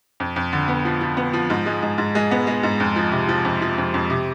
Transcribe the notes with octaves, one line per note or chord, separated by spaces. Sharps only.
F2
F2
D3
B3
F3
F3
B3
F3
G#2
G#3
G#2
G#2
G#3
B3
G#3
G#2
F2
F3
C3
F3
F2
F3
F2
F2
C3